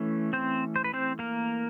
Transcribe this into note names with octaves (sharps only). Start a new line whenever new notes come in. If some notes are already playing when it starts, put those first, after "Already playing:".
Already playing: E3 A3 C#4
C4 C5
C5
B4
C4 C5
A#3 A#4